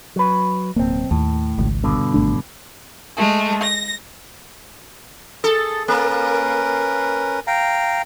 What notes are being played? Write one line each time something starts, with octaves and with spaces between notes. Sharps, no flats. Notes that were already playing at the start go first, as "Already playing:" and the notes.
F#3 B4
D1 B1 A#3 C4
D#2 A2
G#1 C#2
G2 B2 D3
G#1 A3 D4
G#3 A3
A#6
G#4 A4
A#3 C#4 A#4 B4
F5 G5 A#5